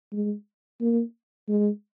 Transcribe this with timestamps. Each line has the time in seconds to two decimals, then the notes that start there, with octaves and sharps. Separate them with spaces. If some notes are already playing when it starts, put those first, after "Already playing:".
0.13 G#3
0.81 A#3
1.49 G#3